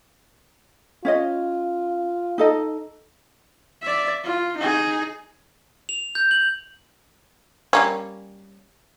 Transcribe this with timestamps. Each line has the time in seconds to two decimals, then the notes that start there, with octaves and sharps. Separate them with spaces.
1.05 C#4 F4 C#5 D#5
2.38 D#4 A4 D#5
3.82 D5 E5
4.24 F4
4.57 D#4 G#4
5.89 F7
6.15 G6
6.31 F#7
7.73 G3 A#3 C#4